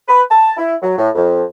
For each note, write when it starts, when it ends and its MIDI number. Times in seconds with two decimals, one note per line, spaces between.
0.08 0.21 71
0.30 0.51 81
0.57 0.74 64
0.82 0.93 54
0.97 1.09 45
1.15 1.42 41